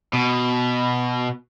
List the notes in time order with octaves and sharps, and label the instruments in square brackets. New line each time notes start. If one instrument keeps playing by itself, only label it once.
[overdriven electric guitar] B2